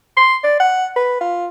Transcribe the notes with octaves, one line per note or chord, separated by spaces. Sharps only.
C6
D5
F#5
B4
F4